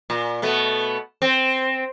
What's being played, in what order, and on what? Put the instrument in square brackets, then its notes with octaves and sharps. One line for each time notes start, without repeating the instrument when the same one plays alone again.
[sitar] A#2
B2 A3 B3
C4